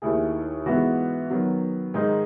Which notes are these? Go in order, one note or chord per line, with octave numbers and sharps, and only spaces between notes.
D#2 D#3 A3 E4 G#4
G#2 E3 G#3 B3 F#4
D#3 F#3 B3
G#2 D#3 G#3 D#4